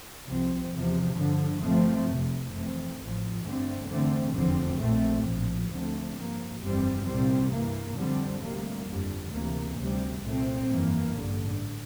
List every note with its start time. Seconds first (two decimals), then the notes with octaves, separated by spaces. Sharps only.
0.26 C2 C3 F3 C4
0.72 E2 C3 F3
1.17 G2 D3 F3
1.62 G1 G2 F3 A3 C4
2.08 F1 F2 C3
2.53 F1 F2 E3 A3 C4
2.99 A1 A2 F3
3.44 G1 G2 D3 A3 C4
3.90 E2 D3 A3 C4
4.35 F1 E2 D3 F3 C4
4.80 A#1 A#2 A3 C4
5.25 A#1 A2 F3
5.70 D2 D3 F3 A3 C4
6.16 G2 F3 A#3
6.61 G1 F2 E3 G3 C4
7.06 C2 A#2 G3 C4
7.51 G2 E3 A#3
7.97 F2 D3 G3 C4
8.42 D2 C3 G3 A#3
8.87 G1 F2 D3 G3
9.32 D2 C3 E3 A#3
9.78 D2 C3 G3 C4
10.23 C2 A#2 A3 C4
10.68 G1 F2 E3 A#3
11.13 A1 G2 D3